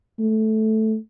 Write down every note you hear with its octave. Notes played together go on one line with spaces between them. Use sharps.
A3